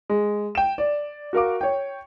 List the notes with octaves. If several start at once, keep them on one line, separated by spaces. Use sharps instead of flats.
G#3
G5 E7
D5
F#4 A#4 F5 D6
C#5 G5